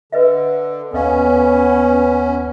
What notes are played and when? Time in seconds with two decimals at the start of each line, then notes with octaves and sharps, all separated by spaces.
0.12 D3 B4 D#5 E5
0.93 D#2 B3 C#4 A4 D#5 F5